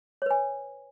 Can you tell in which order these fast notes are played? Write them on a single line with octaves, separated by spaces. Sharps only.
C#5 B4 G#5